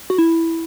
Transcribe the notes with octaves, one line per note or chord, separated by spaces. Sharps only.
F#4
E4